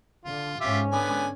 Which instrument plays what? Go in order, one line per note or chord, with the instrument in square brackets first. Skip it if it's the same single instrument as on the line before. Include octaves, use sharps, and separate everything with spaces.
[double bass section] D3 [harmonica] F4
[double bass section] G#2 C#4 [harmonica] F4 G4 E5
[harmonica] D3 B3 G#5